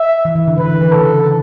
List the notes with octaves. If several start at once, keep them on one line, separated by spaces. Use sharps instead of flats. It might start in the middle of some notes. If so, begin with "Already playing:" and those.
Already playing: E5
E3
E3
D3
E3 B4
E3
E3
C#3 A4